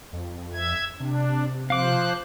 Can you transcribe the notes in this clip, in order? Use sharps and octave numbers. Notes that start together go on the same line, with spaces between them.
F2
E5 G#6
C3 D4
F3 C5 F5 D6 F#6